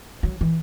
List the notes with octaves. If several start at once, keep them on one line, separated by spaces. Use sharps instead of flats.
F#3
E3